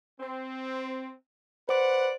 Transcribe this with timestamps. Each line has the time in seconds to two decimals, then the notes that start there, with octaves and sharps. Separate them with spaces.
0.20 C4
1.69 B4 C5 D5 F#5